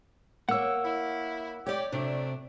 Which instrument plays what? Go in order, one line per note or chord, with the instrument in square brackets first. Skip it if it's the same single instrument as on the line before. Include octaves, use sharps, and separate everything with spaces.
[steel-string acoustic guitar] A#3 C#5 [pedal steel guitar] F#5 E6
[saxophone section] E4
[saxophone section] G4 [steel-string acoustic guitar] C#5 D5
[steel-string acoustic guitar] C3 [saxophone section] F#3 A3 D4